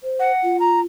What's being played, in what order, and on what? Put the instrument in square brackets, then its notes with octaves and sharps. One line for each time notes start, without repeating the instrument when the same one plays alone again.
[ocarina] C5
[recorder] F#5
[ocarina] F4
[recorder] A#5